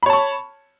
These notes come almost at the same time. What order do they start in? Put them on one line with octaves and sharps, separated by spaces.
B5 C#5 A5 C#6